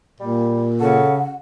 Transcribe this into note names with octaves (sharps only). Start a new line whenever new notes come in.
A#2 G3
C#3 A4 F#5